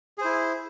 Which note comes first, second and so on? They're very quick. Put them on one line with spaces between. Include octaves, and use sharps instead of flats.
G#4 C5 E4